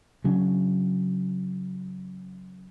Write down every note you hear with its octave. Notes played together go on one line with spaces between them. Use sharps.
C#3 F#3 C#4 D4